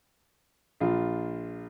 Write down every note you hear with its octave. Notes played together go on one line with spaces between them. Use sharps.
A#1 F4